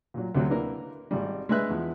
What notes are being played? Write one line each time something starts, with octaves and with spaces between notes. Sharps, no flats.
A#2 F#3
D2 C3 F#3
A#3 D4 E4 A#4 B4
G#1 G3
G#3 D4 B4 E5 F#6
E2 F3 G#3